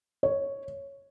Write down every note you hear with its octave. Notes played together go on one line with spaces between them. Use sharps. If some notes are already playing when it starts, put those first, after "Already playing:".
C#5